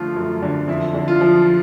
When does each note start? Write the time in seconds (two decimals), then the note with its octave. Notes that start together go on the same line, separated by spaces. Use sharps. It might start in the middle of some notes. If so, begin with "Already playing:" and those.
Already playing: D3 F3 A3 F4
0.16 F#2
0.42 D3
0.68 F2 E4
0.94 D3
1.08 F4
1.21 F3